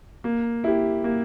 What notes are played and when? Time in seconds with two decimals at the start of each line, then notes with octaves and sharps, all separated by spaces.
0.24 A#3
0.64 E4 G4
1.04 A#3